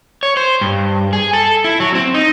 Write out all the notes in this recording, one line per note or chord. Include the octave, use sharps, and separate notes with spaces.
C#5
C5
G2
G#4
A4
E4
F#3
C4
D#4